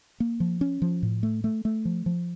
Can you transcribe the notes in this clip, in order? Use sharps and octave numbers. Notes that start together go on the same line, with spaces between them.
A#3
F3
C#4
F3
A2
A3
A3
A3
F3
F3